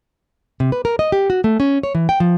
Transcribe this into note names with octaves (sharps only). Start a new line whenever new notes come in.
C3
B4
A#4
D#5
G4
F#4
A3
C#4
C#5
E3
G5
F3